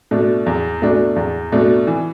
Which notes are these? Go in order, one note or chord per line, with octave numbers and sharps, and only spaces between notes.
B2 A3 D4
E2
B2 A3 D4
E2
B2 A3 D4
E3